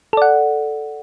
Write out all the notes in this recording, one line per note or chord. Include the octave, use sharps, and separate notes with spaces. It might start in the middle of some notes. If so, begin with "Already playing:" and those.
A4 D5 F#5